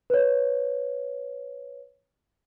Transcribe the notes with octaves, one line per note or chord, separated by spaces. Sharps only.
B4 C#5